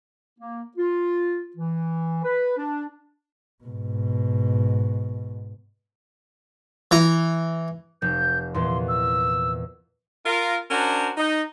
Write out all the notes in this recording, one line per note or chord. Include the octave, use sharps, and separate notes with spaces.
A#3
F4
E3
B4
D4
G#2 B2
E3 A#5
F1 G6
E2 A#2 E3 C6
E6
F4 A#4
C#4 D4 F#4 A#4 C5 A#5
D#4